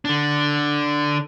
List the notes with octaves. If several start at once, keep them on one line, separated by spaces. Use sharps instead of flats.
D3 D4